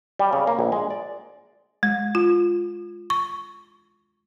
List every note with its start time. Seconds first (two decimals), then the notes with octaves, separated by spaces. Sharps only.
0.19 G3
0.33 C#3
0.47 A#3
0.59 A#1
0.72 G#3
0.90 D5
1.83 G#3
2.15 F4
3.10 C#6